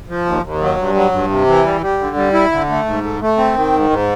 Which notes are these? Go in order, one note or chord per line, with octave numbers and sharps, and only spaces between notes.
F3
D#2
D#2
F#3
G2
F#3
G2
C3
E3
G3
G3
D3
G3
E4
D3
A3
G#2
A3
A3
C4
D#3
G#2
G#2